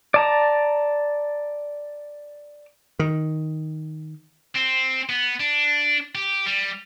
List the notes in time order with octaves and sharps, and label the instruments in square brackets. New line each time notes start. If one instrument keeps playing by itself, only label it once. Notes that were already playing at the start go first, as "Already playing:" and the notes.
[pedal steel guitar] D5 A5 A#5
[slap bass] D#3
[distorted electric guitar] C4
B3
D4
G4
G3